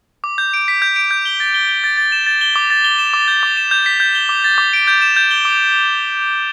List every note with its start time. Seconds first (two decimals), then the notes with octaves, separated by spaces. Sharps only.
0.24 D6
0.38 G6
0.54 D7
0.68 B6
0.82 G6
0.96 D7
1.11 G6
1.25 G7
1.40 A6
1.54 G7
1.69 G7
1.84 A6
1.97 A6
2.12 E7
2.26 A6
2.41 G7
2.56 D6
2.70 A6
2.84 G7
2.98 E7
3.14 D6
3.28 G6
3.43 D6
3.57 E7
3.71 G6
3.86 B6
4.00 G6
4.15 G7
4.29 D6
4.44 A6
4.58 D6
4.73 D7
4.87 G6
5.02 E7
5.16 G6
5.31 G7
5.45 D6